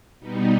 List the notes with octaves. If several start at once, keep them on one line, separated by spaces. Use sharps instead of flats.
B2 G3 B3 D#4